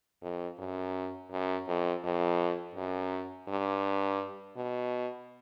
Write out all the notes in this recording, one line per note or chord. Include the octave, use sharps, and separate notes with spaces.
F2
F#2
F#2
F2
F2
F#2
G2
B2